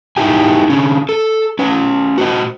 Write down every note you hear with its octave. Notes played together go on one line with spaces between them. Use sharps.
D#4 E4 G4 G#5
D3 C#4
A4
C#4 B4
F#4 C5 D#5